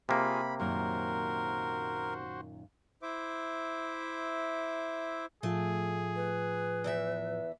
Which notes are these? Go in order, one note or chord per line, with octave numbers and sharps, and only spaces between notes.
C3 A#3 F4 G#4 B5
F#2 A#2 D#3 F#4 A#4 C5
E4 C5 E5 D6
A2 F3 A3 F4 G#4
B4
E2 E3 E5